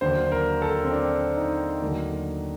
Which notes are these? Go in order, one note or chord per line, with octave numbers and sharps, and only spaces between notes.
D#2 D3 F#3 C5
A#4
A4
C4
D4
D#4
D#2 D3 F#3 A3